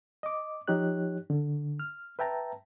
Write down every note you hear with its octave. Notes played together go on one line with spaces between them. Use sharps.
D#5 D6
F3 D#4 G4 C#5 F#6
D3
F6
B4 E5 G5 A5 A#5